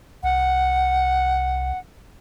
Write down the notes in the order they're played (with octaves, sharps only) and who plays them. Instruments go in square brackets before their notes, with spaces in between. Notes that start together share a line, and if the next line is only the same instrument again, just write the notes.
[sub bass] C2 [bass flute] F#5